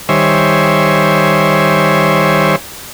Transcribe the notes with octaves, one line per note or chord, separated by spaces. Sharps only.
D#3 G3 C5 C#5 E5 G#5